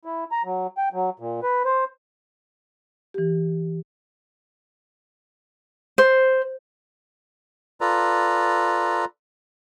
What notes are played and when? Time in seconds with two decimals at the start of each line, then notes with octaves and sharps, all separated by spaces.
0.05 E4
0.32 A#5
0.45 F#3
0.78 G5
0.93 F#3
1.20 A#2
1.43 B4
1.65 C5
3.14 E3 G4
5.98 C5
7.81 F4 A4 B4 D5 A#5